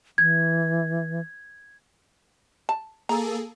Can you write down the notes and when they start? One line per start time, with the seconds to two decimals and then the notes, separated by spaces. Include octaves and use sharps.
0.18 E3 G#6
2.69 A5
3.09 A#3 G#4 A4 A#5